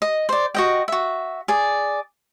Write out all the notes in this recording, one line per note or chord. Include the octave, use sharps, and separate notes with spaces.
D#5
C5 D5
F#4 D#5 G5
F#4 E5
G#4 D5